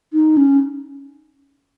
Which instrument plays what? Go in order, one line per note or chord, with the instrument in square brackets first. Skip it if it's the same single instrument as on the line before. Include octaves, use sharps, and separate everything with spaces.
[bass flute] D#4
C#4